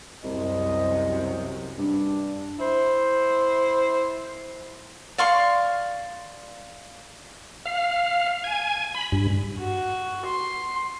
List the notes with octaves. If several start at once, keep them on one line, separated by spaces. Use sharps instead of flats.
C2 F#2 C3 D#5
G2 D4
E4 C5
D5 F5 C6 C#6
F5
G#5
B5
G2
F#4
C6